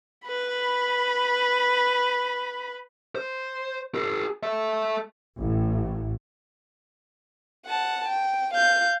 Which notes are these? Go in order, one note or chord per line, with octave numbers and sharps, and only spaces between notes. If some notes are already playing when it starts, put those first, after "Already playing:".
B4 B5
C5
G#4 A#4
A4 E5
A1 A2
F#5 A5
G5
F5 G6